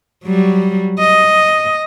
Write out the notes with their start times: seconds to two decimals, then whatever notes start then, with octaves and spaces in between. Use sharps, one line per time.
0.24 F#3 G3
0.99 D#5